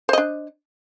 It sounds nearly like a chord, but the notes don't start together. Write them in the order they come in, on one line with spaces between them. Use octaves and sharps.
C5 D#5 D4